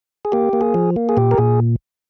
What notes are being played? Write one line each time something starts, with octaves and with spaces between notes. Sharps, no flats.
G#4
A#3 G4
A#3
G#4
F3
A#3
G#4
A#2 G4
A#4
A#2 G#4